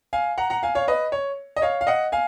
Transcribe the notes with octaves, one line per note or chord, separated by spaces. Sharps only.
F5 G#5
F#5 A#5
F#5 A#5
F5 G#5
C#5 F5
B4 D#5
C#5
D#5
C#5 F5
F5
D#5 F#5
F5 G#5